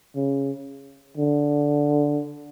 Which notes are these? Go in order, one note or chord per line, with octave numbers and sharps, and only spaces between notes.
C#3
D3